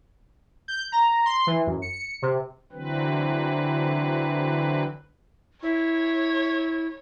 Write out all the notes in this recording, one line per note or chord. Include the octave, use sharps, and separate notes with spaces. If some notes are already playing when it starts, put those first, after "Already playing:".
G6
A#5
C6
E3
F#2
C#7
C3
D3 E3 F#3 C4 B4
E4 C#5